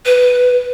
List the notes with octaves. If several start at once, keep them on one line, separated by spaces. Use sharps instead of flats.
B4